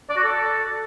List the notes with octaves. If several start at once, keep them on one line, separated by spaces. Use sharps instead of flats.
D5
F#4
A4